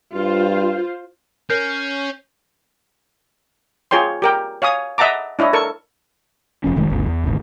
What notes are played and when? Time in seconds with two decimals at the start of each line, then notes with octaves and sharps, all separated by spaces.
0.15 G2 F4 C5
1.50 C#4 A#4 G6 C7
3.91 F4 G#4 C#5 G5 C6
4.22 G4 A#4 G5
4.62 C#5 F5 G#5 D#6
4.98 D#5 E5 F#5 A5 A#5 D6
5.39 D4 E4 C#5 D#5
5.53 A4 A#4 C#6
6.64 F1 F3 C#4
6.76 F1 D#3 G#3
6.90 G1 D2 C#3
7.06 E2 E3
7.24 D#1 G#1 D2